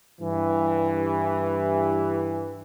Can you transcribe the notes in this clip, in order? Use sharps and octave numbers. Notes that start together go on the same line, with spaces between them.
G2 E3